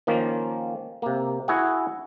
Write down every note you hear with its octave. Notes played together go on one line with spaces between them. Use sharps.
D#3 F3 A#3 C#4
C3 A#3
E4 F#4 G#4 F#5